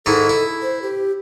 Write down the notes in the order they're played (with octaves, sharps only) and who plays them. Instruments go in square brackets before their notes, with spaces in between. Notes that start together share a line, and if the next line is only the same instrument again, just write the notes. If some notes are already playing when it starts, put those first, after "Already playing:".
[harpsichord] G#2 D#3 E4 [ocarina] A4
[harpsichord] E4
[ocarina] C5
G4